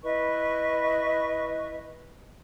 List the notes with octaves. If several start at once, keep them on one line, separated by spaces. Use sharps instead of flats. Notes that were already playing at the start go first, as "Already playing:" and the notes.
E4 B4 D#5 C#6